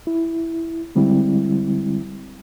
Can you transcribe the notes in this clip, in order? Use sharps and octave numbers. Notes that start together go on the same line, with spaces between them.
E4
D3 G3 G#3 C4 E4